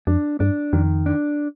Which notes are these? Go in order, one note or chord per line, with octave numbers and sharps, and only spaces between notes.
F2 D4
G2 D4
F2 D#3
D4